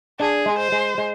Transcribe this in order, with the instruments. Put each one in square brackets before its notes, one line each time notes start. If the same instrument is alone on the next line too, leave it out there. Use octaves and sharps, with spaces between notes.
[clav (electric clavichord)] D4 [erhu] G#4
[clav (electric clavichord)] G#3
[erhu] C5
[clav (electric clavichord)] G#3
G#3